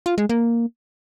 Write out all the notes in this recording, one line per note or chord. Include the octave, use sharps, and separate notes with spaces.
F4
G#3
A#3